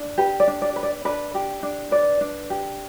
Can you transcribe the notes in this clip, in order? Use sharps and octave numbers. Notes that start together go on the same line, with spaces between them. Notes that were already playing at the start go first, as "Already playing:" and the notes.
Already playing: D4
G4 B4
D5
D4
D5
B4
D5
D4 B4
G4
D4
B4 D5
D4
G4